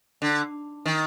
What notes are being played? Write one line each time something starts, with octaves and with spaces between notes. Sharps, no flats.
D3
D#3